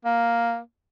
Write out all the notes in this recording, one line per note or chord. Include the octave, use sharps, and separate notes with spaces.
A#3